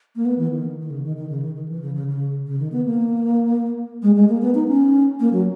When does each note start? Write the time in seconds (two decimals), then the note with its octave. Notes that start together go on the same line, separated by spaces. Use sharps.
0.16 A#3
0.25 B3
0.38 E3
0.51 D#3
0.80 D#3
0.90 C#3
1.03 D#3
1.17 D#3
1.29 C#3
1.42 D#3
1.56 D#3
1.68 E3
1.81 C#3
1.95 C#3
2.07 C#3
2.47 C#3
2.59 D#3
2.72 B3
2.86 A#3
4.03 G#3
4.16 G#3
4.29 A#3
4.42 B3
4.55 D#4
4.68 C#4
5.20 A#3
5.33 F#3